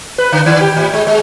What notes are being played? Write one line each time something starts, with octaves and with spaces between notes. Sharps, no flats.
B4
D3
D#3
G4
A2
G#3
G#3